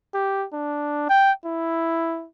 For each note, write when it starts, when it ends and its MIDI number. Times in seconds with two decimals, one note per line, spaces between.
0.14 0.46 67
0.53 1.05 62
1.09 1.31 79
1.45 2.26 64